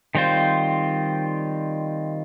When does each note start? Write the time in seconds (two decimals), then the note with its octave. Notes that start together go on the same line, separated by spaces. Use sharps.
0.15 D#3 G3 C4 F4 C5